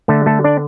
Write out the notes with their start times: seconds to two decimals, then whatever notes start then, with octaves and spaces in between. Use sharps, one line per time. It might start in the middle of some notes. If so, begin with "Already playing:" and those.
0.08 D3 A3 A4
0.26 A3 A4
0.44 D4 D5